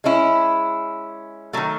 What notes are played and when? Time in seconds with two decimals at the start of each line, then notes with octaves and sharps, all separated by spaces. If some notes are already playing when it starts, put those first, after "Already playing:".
0.04 G#3 C#4 E4
1.53 D#3 F#3 A3